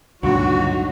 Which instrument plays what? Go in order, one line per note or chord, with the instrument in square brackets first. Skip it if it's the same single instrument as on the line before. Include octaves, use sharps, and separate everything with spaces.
[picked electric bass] C#2 G2 A#2 [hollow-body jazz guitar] D3 [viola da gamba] F#3 G#3 D#4 [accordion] F#4